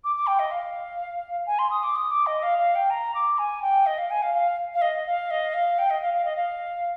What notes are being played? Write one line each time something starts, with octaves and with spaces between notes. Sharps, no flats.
D6
D6
G5
D#5
F5
G#5
C6
D#6
D6
D#6
D6
D#5
F5
F5
G5
A#5
D6
G#5
G5
D#5
F5
G#5
F5
F5
F5
D#5
F5
D#5
F5
G5
D#5
F5
F5
D#5
F5